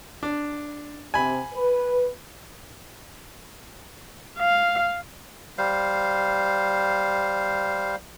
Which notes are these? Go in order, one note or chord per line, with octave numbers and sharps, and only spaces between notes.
D4
C3 G#5 B5
B4
F5
G3 C5 F5